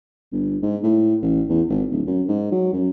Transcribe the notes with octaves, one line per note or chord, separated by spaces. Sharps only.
G1
G#2
A2
A1
E2
G#1
D1
F#2
G#2
F#3
F#2